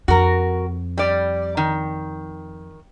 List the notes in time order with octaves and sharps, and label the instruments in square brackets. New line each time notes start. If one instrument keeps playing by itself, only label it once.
[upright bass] F2 [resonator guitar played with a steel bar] F#4 A#4
[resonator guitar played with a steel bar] G3 D5
D#3